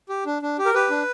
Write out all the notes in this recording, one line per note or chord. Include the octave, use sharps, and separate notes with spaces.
G4
D4
D4
G4
A#4
G4 B4
D4